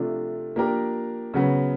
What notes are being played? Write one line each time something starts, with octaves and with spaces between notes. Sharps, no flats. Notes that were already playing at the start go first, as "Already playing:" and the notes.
Already playing: C3 F3 A3 D4 F4
F3 A#3 D4 G4 A#4
C#3 F#3 B3